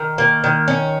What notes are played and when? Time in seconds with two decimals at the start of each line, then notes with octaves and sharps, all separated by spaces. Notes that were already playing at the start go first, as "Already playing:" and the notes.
Already playing: D#3
0.18 A#3
0.44 D#3
0.68 C#4